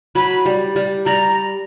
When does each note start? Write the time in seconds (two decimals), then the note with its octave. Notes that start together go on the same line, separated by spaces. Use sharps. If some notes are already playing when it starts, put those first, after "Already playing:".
0.15 F#3 B5
0.46 G3
0.76 G3
1.06 G3 A#5